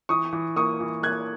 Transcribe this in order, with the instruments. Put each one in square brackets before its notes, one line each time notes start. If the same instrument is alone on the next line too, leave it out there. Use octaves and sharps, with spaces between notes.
[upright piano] E3 C#6 D#6
E3
A#3 C#6 D#6
E3
A#3 F#6 G#6